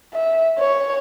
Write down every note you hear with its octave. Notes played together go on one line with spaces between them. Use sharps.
E5
C#5